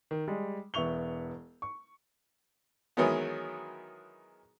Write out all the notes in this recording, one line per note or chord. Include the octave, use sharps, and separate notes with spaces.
D#3
G3 G#3
E1 B3 E4 C#6 F7 G7
C#6
D#3 E3 F#3 G#3 B3